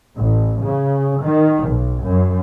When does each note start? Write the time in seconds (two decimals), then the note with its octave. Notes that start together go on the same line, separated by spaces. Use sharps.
0.17 A1
0.64 C#3
1.25 D#3
1.69 B1
2.05 F#2